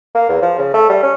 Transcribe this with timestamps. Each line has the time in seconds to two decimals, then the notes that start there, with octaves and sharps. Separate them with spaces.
0.15 A#3
0.29 E2
0.42 F3
0.59 C#3
0.74 A3
0.90 G3
1.03 C#4